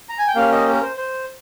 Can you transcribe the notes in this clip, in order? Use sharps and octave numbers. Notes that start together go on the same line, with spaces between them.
A#5
G#5
G5
A#3 C#4 G4 F5
D#5
A#4
C5
C5